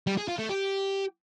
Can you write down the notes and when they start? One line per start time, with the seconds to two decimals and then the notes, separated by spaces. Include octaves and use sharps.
0.07 G3
0.17 G#4
0.28 F4
0.39 A3
0.49 G4